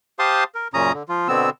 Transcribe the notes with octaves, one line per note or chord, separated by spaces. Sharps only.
G4 C5 F5 A5 C6 D#6
A#4
F#2 A#2 C#3 C#4 A#5 D#6
D3
F3 F4
B2 D3 B3 C4 E6